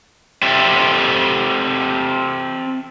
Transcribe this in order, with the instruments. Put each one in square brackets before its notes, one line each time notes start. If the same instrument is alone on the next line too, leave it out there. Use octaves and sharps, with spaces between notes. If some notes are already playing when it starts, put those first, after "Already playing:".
[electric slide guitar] C4 G4 A4 E5